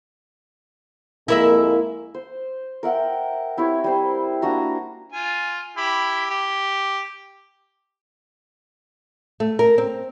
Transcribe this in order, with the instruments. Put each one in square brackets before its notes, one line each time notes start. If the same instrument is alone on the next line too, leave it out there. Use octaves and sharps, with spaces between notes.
[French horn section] F2 G#3 A#3 [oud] E4 A#4 E5
[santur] C5
A#4 E5 F#5 G5
C4 E4 G4 C#5
G3 C5
A#3 D4 F#4 A#5
[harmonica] F4 G#5
E4 G4 B5
G4
[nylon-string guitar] A3
A#4
C4